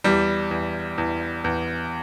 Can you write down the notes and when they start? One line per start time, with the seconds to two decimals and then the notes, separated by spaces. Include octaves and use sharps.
0.04 E2 G3
0.51 E2
0.98 E2
1.44 E2